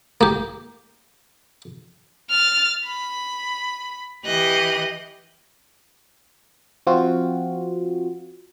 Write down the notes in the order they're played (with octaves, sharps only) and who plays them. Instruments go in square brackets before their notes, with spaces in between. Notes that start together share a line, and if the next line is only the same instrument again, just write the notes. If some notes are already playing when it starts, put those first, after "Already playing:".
[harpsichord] A#3 G4
[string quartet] F6 A6
B5
E3 G4 D#5 F#6
[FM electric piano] F3 C4 F4 F#4